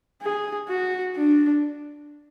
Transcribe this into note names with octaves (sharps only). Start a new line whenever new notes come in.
G#4
F#4
D4